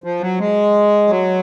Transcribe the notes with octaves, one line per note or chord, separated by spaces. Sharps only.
F3
F#3
G#3
F#3